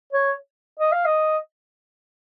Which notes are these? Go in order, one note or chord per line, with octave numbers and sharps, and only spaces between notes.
C#5
D#5
F5
D#5